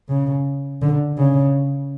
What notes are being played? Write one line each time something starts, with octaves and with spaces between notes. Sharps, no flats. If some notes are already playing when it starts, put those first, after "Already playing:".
C#3
D3
C#3